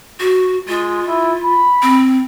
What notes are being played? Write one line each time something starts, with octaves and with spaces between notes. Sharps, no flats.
F#4
G#3 F4
E4
B5
C4